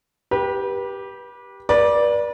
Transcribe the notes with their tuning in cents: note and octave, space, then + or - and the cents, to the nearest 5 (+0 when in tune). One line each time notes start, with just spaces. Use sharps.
G4 +0 B4 -35
B4 -40 D5 +0